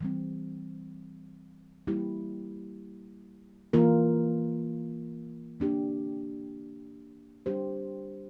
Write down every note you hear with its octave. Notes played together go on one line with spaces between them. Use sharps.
E3 G3 C4
G3 A#3 E4 G4
E3 A#3 F4 A#4
A#3 D4 G4
G3 D4 G4 C5